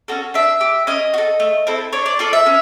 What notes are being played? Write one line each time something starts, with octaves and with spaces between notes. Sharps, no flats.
C#4 F#4 A4
D4 E5
G4
C#4 D#5
F#4
A4
A3
C4 E4 A4
D4 C#5
D5
F4 A4 D5
E5
C#4